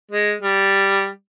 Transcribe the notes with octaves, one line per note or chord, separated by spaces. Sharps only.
G#3
G3